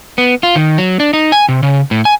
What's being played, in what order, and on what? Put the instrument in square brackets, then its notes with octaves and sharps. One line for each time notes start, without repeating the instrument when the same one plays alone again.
[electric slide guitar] B3
F4
D#3
F#3
D4
D#4
G#5
C3
C#3
A2
G#5